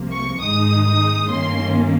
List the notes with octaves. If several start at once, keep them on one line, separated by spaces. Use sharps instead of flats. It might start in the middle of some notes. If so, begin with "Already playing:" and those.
Already playing: C2 C3 F3 A#3
C#6
G#2 D#3 G#3 D#4 D#6
D#6
G2 D#3 A#3 C#4 C6